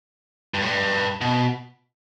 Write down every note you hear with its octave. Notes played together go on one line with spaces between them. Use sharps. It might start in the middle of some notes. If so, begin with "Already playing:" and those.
G2
A2
G2
B2